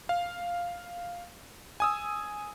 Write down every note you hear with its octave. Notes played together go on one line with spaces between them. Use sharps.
F5
G#5 D#6 E6